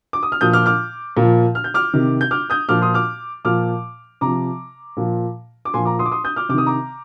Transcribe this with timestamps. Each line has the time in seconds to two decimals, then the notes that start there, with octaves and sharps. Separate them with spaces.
0.13 D6
0.23 D#6
0.32 F6
0.41 A#2 F3 D#6 G6
0.53 D6 F6
0.66 D6 F6
1.17 A#2
1.22 F3
1.55 F6
1.64 G6
1.74 D6 F6
1.93 C3 D#3
2.21 G6
2.31 D6 F6
2.50 D#6 G6
2.69 A#2 F3 D6 F6
2.82 C6 D#6
2.94 D6 F6
3.45 A#2 F3 D6 F6
4.21 C3 F3 A#5 D6
4.97 A#2 F3
5.65 D6
5.74 A#2 F3 G#5 C6
5.85 A#5 D6
5.99 C6 D#6
6.06 D6
6.11 C6 D#6
6.24 D#6 G6
6.36 D6 F6
6.49 C3 D6
6.54 D#3 D#6
6.66 A#5 D6